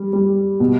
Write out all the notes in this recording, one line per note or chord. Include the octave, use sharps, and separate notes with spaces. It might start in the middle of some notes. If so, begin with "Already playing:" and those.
Already playing: G3
G3
B2